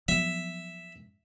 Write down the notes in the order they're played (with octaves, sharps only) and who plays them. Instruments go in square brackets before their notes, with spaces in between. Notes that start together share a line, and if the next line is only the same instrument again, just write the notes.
[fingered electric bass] F3 F#3 B3 [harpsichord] E5